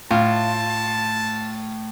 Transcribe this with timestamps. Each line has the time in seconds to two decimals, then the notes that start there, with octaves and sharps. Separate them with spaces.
0.11 A2 F4 A5